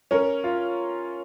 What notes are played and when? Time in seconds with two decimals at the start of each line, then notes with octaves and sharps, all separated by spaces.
0.11 C#4 A#4
0.44 F4